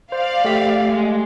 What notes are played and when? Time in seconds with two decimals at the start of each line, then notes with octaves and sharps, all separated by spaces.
0.12 C5 D5 F5
0.45 A3 G4 B6
0.92 G#3